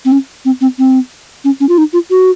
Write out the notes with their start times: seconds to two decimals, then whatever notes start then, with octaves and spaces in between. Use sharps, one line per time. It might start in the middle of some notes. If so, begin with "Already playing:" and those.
0.05 C4
0.12 C#4
0.45 C4
0.61 C4
0.79 C4
1.45 C#4
1.60 C#4
1.69 F4
1.78 D#4
1.93 F4
2.11 F#4